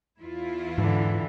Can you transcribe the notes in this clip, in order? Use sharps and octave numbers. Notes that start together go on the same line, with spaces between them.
E2 E4 F4
G#2 D3 E3